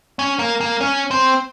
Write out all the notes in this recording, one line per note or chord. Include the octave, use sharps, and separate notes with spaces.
C#4
A#3
A#3
C#4
C4